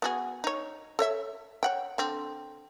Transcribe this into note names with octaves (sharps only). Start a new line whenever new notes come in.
B3 F#4 G#4
D#4 C#5
A4 C#5 E5
C#5 F#5 G5
D3 C4